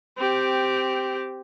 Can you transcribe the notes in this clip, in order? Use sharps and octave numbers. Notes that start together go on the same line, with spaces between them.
C4 G4